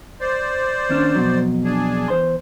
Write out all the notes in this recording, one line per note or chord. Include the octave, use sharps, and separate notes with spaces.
C5 D5
D#2 C#4 D4
F2 B2 F#3
D4 G#4
E2 C5 C6